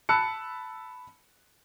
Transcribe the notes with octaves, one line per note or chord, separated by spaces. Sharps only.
A5 B5 E6 F#6 C#7